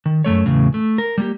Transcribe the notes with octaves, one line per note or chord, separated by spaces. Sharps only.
D#3
F#2 F3 A3 C#5
E2 A2 C#3 F#3
A3
A#4
G3 A#3 G4